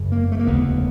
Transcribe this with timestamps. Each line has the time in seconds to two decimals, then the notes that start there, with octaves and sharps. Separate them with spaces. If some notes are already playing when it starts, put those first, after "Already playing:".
Already playing: F#1 F#2 C#3
0.12 A#3
0.32 A3
0.39 A#3
0.46 F1 D#2 C#3 B3